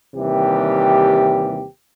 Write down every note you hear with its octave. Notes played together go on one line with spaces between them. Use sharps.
D#2 C3 E3 G3 G4